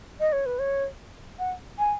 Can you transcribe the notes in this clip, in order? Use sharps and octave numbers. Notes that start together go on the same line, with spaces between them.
D#5
C#5
B4
C#5
F#5
G#5